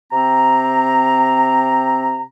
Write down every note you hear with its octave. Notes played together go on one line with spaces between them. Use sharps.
C3 C4 A#5